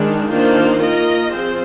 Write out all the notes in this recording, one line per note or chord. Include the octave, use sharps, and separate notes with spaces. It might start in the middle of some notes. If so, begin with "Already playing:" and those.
Already playing: D#3 G#3 D4
D#3 A#3 D4 F4 C5
A#3 F4 A#4 D#5
F3 C4 F4 G#4 C5